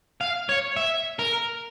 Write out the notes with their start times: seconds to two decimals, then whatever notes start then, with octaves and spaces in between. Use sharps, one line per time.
0.21 F5
0.49 C#5
0.77 E5
1.19 A#4